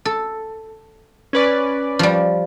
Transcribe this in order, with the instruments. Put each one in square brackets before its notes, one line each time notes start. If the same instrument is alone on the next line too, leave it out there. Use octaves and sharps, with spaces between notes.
[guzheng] A4
[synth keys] C#4 B4 D5
[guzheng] F3 G3